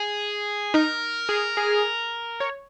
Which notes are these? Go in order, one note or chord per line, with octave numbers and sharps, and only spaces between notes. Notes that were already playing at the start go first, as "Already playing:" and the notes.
Already playing: G#4
D#4 A#4
G#4
G#4
C#5